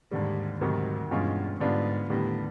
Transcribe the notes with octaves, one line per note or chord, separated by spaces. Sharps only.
D#2 G#2 D3 G3
D2 G#2 C3 D#3 F#3
E2 G2 B2 G#3 C#4 F4
G#2 D3 G3 B3 D4 F4
D#2 A2 D3 G3 B3 D4